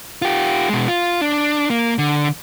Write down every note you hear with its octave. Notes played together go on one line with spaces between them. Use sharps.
F4 G4
B2 G#3
F4
D4
A#3
D3